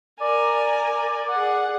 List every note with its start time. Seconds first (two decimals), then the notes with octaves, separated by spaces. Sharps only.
0.21 A#4 D5 G#5
1.30 G#4 F#5